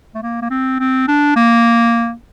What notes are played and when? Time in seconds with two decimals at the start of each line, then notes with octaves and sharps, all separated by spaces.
0.15 A3
0.22 A#3
0.42 A#3
0.51 C4
0.80 C4
1.08 D4
1.36 A#3